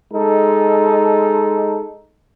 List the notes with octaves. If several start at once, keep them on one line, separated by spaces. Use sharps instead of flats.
G#3 D#4 A4